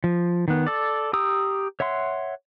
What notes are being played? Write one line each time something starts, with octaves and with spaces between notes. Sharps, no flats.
F3
D#3 B3
A4 D5
G4 A#5 D#6 E6
C#5 E5 F#5 C6